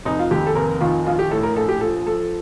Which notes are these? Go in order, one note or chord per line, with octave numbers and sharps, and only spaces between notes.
F1 D#4
F4
D#2 G4
A4
F1 A#4
D#3 F4
A#1 F4
G4
A2 A4
A#4
A#1 A4
G4
F3 A4
F3 A4